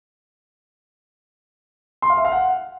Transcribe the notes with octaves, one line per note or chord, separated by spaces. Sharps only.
C6
F5
E5
F5
F#5